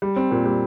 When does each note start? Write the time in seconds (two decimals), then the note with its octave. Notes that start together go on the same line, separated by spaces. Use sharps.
0.02 G3
0.16 C4
0.31 A#2
0.45 G3